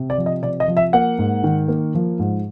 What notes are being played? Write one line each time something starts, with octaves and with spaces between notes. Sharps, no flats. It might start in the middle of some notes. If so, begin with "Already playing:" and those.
Already playing: C3
D5
F3
D#5
C3 D5
D#5
F3
E5
A#3 F#5
G#2
D#3
A#3
F3
G#2